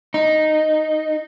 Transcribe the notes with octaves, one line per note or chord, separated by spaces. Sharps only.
D#4